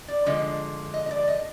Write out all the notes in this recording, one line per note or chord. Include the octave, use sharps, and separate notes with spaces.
D5
D3 F3 G#3 D#5
D#5
D#5
D5
D#5